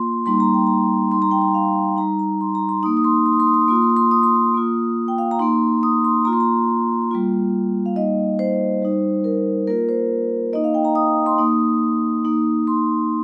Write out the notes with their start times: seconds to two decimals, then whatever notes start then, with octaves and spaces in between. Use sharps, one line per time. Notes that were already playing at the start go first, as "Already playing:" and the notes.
Already playing: A#3 F4 C6
0.26 G3 A#3 D#4 C6
0.40 A#5
0.54 G5
0.67 A#5
1.12 G3 D#4 C6
1.22 A#5
1.31 G5
1.42 A#5
1.54 F5
1.97 G3 D#4 A#5
2.19 A#5
2.41 C6
2.55 A#5
2.69 C6
2.83 A#3 D#4 D#6
2.97 D#6
3.04 C6
3.26 C6
3.33 D#6
3.40 C6
3.47 D#6
3.54 C6
3.62 D#6
3.68 A#3 F4 C6
3.75 D#6
3.82 C6
3.90 D#6
3.97 C6
4.11 D#6
4.23 C6
4.36 D#6
4.54 A#3 F4
5.08 G5
5.18 F5
5.31 A#5
5.39 A#3 D#4 C6
5.83 D#6
6.04 C6
6.25 A#3 F4 A#5
6.33 C6
6.40 A#5
7.11 G3 A#3 F4
7.86 F5
7.96 G3 A#3 D#4 D#5
8.39 C5
8.82 G3 D#4
9.24 A#4
9.67 A#3 F4 A#4
9.89 C5
10.53 A#3 D#4 D#5
10.64 F5
10.74 G5
10.85 A#5
10.95 D#6
11.26 C6
11.38 A#3 D#4 D#6
12.25 A#3 D#4
12.67 C6